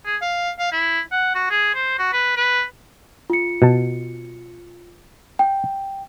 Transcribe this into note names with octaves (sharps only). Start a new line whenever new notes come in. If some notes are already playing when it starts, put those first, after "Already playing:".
G#4
F5
F5
E4
F#5
F#4
G#4
C5
F#4
B4
B4
F4 C#7
B2 A5
G5